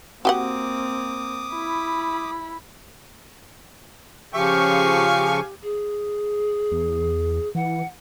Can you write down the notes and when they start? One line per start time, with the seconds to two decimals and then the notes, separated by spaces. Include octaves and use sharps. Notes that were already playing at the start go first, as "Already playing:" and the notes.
0.25 A#3 C4 F#4 G4 F#5 D6 D#6
1.53 E4 B5
4.34 C#3 F3 G4 F5 G#5 C#6
5.62 G#4
6.72 E2
7.55 E3 F#5